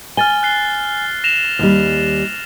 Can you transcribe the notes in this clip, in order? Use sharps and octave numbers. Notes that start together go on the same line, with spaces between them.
G#5 F6 A6 G7
F#6 C7 G7
A#6 E7 F7
D#2 G3